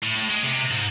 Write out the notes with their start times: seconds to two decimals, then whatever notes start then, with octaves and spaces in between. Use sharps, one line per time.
0.03 A2
0.16 A2
0.30 G#3
0.43 C3
0.71 G#2